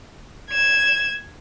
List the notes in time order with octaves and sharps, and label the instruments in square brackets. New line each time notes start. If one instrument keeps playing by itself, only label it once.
[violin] G#6 E7